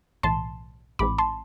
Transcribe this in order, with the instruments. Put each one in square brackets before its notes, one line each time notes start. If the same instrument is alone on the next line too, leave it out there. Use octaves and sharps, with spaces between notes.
[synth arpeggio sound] B1 A2 E3 A5 C6
A1 G#2 E3 G#3 C4 B5 D6
A5 C6